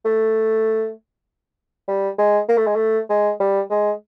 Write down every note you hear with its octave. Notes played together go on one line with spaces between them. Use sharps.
A3
G3
G#3
A#3
A3
G#3
A3
G#3
G3
G#3